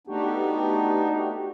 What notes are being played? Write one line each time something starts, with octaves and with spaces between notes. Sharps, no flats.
A3 B3 D4 D#4 F#4 G4